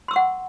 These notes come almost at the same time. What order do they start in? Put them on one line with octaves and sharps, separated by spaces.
C6 E6 C#6 F#5